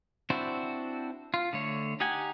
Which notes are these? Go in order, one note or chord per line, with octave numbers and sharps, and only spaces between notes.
C4 D4 E4 F#4 C5
F4
D3 A3 C#5
D#4 G4 F#5 G#5